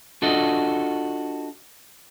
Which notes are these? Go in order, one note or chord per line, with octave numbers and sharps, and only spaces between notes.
D4 F4 F#4 A4 D#5